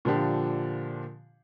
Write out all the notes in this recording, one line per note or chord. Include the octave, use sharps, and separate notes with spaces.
A#2 D3 F3 D4 G4